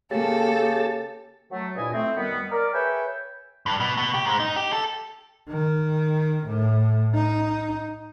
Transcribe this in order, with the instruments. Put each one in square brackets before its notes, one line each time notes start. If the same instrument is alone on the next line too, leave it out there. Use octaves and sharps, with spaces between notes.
[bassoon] C#3 [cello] A#3 [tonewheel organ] G4 A5 [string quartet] A4
[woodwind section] F#3 A3
D2 G2 A#2 E4 D#5 G#5
A3 C4
F#2 D#3 G3 B3
A#4 D5
G#4 B4 C#5 E5 G5
[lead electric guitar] G2
B2
B2
G4
G#2
D#4
G4
A4
[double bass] D#3
A2
D#4